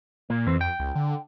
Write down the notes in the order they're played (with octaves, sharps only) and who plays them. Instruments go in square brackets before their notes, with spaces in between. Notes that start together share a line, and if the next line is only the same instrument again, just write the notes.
[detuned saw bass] A#2 [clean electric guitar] A#3
[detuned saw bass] F2 [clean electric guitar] E3 C4
[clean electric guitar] G5
[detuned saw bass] C#2
D3